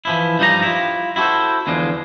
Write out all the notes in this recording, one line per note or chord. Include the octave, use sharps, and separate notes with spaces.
E3 F3 E4
G2 F3 G3 D#4 G4 A#5
E4 F4
E4 F#4 G4 A4 C5
E2 D3 F3 G#3